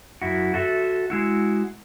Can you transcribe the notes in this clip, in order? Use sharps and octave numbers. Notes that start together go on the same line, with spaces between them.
F#2 E4 F#4
F#4 A4 E5
G#3 E4 F#4